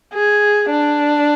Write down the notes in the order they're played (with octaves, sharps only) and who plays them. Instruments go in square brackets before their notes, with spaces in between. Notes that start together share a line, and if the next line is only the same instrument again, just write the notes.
[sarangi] G#4
D4